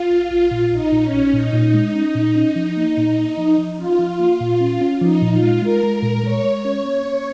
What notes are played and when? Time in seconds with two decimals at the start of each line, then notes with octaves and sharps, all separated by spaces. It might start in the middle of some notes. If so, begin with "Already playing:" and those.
Already playing: F4
0.10 A#1
0.31 A#1
0.51 A#2
0.72 A#1 D#4
0.92 A#2
1.03 C#4
1.13 A#1
1.33 A#2 D#4
1.53 A#2
1.74 G#3
1.95 C#4
2.15 A#2
2.36 C#4
2.56 F3
2.77 A#3
2.97 A#2
3.17 A#3
3.38 F3
3.58 F3
3.78 C#4 F4
3.99 F3
4.20 A#3
4.40 A#2
4.60 C#4
4.81 C#4
5.01 F3 D#4
5.22 A#2
5.32 F4
5.43 G#3
5.62 G#3 A#4
5.83 G#3
5.93 A#4
6.03 A#2
6.23 G#3 C#5
6.44 G#3
6.54 C#5
6.65 C#4
6.85 A#3
7.06 C#4